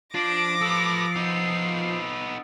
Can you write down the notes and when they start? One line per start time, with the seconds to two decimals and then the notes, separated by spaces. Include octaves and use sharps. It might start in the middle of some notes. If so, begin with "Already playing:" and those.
0.14 F3 D4 D6 A6 A#6 C7 D7
0.61 A4 B4 D#6 E6 C#7
1.16 B3 D#4 C7